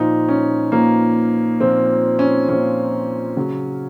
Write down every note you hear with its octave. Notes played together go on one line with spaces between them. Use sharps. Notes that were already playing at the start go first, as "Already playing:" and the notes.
Already playing: A#2 F3 D#4
C#4
A#2 F3 A#3
A#2 F3 C4
C#4
A#2 F3 C#4
C#3 F#3